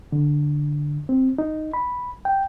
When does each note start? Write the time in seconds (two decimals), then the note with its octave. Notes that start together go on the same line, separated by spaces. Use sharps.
0.12 D3
1.09 C4
1.38 D#4
1.74 B5
2.25 G5